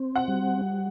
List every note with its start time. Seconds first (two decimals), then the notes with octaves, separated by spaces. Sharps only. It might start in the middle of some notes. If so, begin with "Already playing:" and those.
Already playing: C4
0.16 F#5
0.28 G3